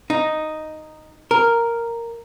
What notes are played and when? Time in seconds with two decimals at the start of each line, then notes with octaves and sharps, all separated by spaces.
0.10 D#4
1.31 A#4